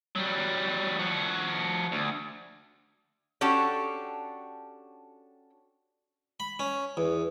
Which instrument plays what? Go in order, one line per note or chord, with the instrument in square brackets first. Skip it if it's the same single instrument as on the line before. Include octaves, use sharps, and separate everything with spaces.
[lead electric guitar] F#3 G3
F3 F#4
D2
[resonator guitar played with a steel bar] C#4 D4 F#4 G4 A4
[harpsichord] B5
C#4
E2